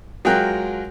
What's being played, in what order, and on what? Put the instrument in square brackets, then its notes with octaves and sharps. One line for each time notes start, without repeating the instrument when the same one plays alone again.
[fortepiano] F#3 G#3 F4 A#4 G5 F#6